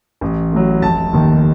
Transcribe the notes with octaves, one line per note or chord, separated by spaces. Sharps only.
A1
A2 F#3
F1 A5
D#2 D#3